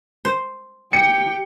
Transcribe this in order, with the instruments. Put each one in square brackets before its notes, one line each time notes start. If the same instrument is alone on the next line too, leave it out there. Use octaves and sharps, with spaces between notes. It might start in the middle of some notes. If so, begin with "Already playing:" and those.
[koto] C5
[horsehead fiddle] G4 G5 [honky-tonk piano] C#7